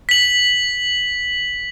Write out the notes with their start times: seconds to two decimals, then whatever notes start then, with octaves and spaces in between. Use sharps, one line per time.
0.09 B6 F#7